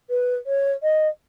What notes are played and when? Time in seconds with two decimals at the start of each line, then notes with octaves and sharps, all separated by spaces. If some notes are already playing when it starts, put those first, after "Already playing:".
0.10 B4
0.46 C#5
0.83 D#5